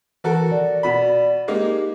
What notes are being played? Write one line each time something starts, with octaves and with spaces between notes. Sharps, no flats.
E3 F#4 A4 A#4
D5
B2 B5
G#3 A#3 D#4 G4